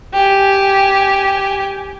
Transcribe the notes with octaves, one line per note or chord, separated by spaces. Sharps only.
G4 G#5